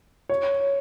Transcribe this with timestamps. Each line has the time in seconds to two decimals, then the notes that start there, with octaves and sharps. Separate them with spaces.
0.29 C#5